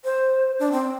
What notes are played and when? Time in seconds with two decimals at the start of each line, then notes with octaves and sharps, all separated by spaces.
0.04 C5
0.59 D4
0.72 C4